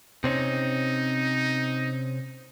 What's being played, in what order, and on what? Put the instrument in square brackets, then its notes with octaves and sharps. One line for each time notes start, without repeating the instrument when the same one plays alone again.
[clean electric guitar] C3 C4 C#4 [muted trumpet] D#4